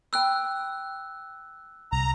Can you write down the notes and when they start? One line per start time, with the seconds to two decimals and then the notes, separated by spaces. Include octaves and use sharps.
0.13 G5 B5 E6 F#6
1.92 C2 A#5